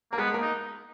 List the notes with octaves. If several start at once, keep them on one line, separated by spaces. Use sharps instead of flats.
A#3 A#4
G#3 B3 G#4
A#3 A#4
D#4